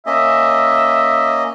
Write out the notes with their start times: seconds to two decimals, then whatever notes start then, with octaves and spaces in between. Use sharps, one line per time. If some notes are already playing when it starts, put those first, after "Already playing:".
0.06 A#3 C#4 D#5 E5